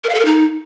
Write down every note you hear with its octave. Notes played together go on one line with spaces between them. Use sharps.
A#4
F5
A4
A#4
D#4